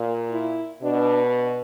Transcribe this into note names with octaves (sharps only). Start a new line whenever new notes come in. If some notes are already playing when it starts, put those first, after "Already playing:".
Already playing: A#2
E4
B2 D4